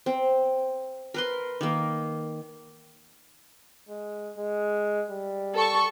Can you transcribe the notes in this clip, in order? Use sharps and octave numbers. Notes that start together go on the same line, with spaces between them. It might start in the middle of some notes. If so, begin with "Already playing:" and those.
C4
A#4 B4 C6
D#3 A#3
G#3
G#3
G3
A4 C#6